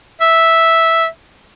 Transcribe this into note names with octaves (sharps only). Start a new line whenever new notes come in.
E5